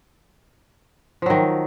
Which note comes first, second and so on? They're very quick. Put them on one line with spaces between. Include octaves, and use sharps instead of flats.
F3 F#3 D#3